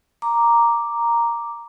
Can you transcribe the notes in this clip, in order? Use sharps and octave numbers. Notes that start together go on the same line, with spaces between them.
A#5 D6